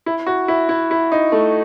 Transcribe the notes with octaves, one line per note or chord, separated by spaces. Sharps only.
E4
F#4
E4
E4
E4
D#4
A3